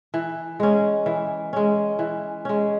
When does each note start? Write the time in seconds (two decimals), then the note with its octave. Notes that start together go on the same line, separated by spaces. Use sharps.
0.14 E3
0.60 G#3 C#4
1.06 E3
1.53 G#3 C#4
1.99 E3
2.45 G#3 C#4